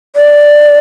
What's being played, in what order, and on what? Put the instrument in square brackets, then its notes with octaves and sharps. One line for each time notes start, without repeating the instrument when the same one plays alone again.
[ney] D5